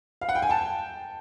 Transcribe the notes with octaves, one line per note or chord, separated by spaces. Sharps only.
F5
F#5
G5
G#5
G5 A5